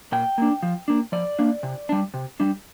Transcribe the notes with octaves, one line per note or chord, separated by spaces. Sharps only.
A#2 G5
A#3 D4
F3
A#3 D4
F3 D5
A#3 D4
C3
G3 D4
C3
G3 D4